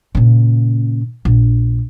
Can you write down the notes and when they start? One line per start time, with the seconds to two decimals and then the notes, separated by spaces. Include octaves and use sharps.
0.15 A#2 C#3
1.25 A#1